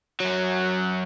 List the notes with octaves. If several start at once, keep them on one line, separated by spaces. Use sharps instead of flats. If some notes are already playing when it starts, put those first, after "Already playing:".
F#2 F#3